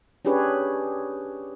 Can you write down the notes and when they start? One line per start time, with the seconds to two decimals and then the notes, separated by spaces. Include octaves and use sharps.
0.25 C#4 D4 G4 G#4 B4 C#5